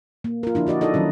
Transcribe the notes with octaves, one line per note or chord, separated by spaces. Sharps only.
A#3
F4 A#4
D3 F3 D4 E4
D4 F#4 D5 D#5
D#4 E4 A4 D5 D#5
D#3 F#3 C#4